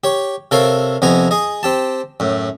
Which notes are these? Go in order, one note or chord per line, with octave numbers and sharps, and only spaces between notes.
G4 C#5
C3 A4 A#4 C#5 F5
F2 C3 B3 G#5 A#5
G#4 D#5
C4 G4 A5
F#2 A2